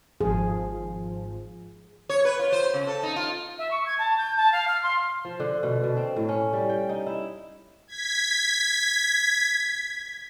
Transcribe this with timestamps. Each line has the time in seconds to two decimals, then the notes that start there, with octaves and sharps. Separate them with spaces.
0.21 G#1 F3 G#4
2.09 C#5
2.25 B4
2.39 F4
2.52 C5
2.74 C#3
2.87 A4
3.03 D#4
3.16 F4
3.58 E5
3.71 C#6
3.86 G#6
3.99 A5
4.18 G6
4.37 A5
4.52 F5
4.68 F6
4.83 C6
5.25 F3
5.40 D3
5.63 B2
5.84 B2
5.97 C4
6.16 A2
6.29 C#4
6.53 G3
6.69 G5
6.89 D#4
7.07 E4
7.88 G#6 B6